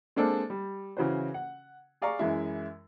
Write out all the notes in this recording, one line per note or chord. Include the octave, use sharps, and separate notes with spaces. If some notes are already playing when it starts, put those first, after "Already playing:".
G#3 A#3 C4 D4 A4 C5
G3
C#3 E3 F#4 B4 C5
F#5
G#4 D5 F5 A#5 C#6
F#2 E3 G#3 E4